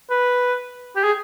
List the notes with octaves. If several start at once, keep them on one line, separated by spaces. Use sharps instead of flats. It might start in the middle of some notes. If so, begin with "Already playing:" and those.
B4
G4
G#4